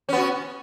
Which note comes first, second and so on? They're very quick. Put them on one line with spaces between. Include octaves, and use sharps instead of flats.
C#4 B3 F#4